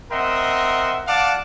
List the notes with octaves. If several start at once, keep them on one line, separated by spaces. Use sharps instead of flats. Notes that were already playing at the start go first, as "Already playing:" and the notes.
C4 A#4 D#5 E5 F#5 C6
D5 F5 F#5 A5 D6